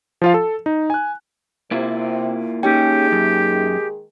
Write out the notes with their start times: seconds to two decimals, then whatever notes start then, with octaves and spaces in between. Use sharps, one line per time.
0.22 F3 F4 F5
0.34 A4
0.66 D#4
0.90 G#5 F#6
1.71 C3 A#3 E4 F4
2.63 D#3 G#3 A#3 C#4 D#4 G4 G#4 G5
3.12 F#2